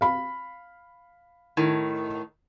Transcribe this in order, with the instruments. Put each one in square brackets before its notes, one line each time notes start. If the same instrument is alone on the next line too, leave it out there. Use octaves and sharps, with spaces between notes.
[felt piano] F5 B5
[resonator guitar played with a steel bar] A2 D#3